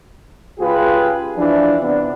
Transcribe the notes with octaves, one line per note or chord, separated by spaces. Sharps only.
C#2 F4 G4 G#4 B4
E3 F3 D4
C3 B3 D4